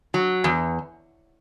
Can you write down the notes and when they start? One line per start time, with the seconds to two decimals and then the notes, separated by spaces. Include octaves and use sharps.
0.14 F#3
0.44 E2